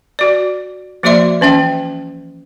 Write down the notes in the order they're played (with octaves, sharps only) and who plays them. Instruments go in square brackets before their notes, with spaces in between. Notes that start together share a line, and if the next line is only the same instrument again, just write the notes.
[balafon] F#4 D5
F3 A#3 F#4 D5 E5 C6
E3 C#4 E5 G5